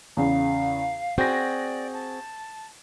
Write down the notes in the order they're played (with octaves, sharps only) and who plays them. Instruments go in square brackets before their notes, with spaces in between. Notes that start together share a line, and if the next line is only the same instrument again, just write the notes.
[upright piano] E2 C#3 C#4 [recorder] F5
[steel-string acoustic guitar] C4 F#4 G#4 [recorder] D5 [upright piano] G6 A#6
[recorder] A5